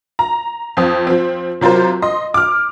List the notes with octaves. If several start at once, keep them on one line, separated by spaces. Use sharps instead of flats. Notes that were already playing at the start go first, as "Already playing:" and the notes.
A#5
F2 F3 C4 D#6
F3 C4
C3 F#3 F4 A#4 C5
D#5 C6
D6 F6